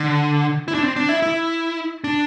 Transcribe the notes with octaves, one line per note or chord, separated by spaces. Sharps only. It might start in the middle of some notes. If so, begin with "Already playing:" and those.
Already playing: D3
E4
D4
C4
D4
E4
E4
D4